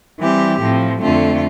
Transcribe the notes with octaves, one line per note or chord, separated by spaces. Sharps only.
E3 G3 C4 G4
A2 F3 C4
F2 D3 A3 C4 F4